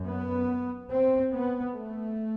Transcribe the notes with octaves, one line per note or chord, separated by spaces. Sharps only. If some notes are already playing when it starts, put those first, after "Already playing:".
Already playing: F#2
B3
C4
B3
A3